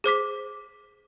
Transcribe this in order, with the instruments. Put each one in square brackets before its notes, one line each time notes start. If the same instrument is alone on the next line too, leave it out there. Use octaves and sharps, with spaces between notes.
[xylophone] G#4 C5 D6 B6